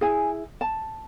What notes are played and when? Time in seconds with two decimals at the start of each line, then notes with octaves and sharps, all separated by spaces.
0.01 E4 G#4 G#5
0.61 A5